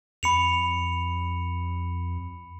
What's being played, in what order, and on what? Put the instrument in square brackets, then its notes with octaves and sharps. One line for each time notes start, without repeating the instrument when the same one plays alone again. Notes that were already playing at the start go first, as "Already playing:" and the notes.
[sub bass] F2 [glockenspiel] B5 C#7 F7